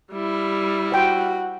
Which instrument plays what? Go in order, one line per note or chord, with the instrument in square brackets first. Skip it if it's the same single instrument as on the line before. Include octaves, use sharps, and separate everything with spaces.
[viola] G3 E4
[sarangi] F#4 [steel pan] C5 G5